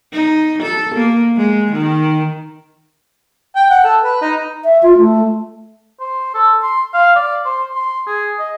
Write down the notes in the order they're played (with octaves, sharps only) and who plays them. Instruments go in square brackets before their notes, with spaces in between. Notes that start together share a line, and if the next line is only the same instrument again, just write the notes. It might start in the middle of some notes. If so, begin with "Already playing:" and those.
[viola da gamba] D#4
A4
A#3
G#3
D#3
[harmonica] G5
F#5
A4
B4
D#4
[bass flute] E5
F4
A3
[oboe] C5
A4
C6
F5
D5
C5
C6
G#4
D#5